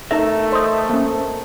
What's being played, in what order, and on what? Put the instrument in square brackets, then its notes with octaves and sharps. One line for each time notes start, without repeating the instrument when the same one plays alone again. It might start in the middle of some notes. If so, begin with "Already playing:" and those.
[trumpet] A3 [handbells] D#4 A#6 [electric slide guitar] A4 A#4 E5
[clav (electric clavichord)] C5 D#5
[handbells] A#3 C#4